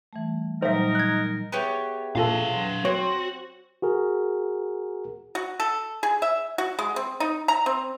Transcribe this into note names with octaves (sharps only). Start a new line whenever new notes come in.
E3 G3 A3
A#2 F#3 G3 D#4 A#4 C5 E5
F#6 G#6
B3 G4 G#4 C#5 E5
A#2 F3 A4 B4 F5
F#3 C6
C4 F#4 C#5
F#4 G#4 A#4
F#4
A4
G#4
E5
F#4
G#3
C4
D#4
A#5
C4